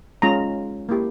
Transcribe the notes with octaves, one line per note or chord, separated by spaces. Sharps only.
G#3 C#4 F4 A#5
A#3 E4 G4